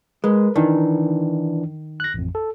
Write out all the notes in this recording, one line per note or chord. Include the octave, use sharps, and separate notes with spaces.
G#3 A#4 B4
D#3 E3 D4
F#6 A#6
A1 F2
A4